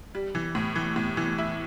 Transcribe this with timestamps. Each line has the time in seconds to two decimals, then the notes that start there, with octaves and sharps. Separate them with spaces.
0.15 G3
0.35 E3
0.55 A2
0.76 E3
0.96 A2
1.17 E3
1.38 E4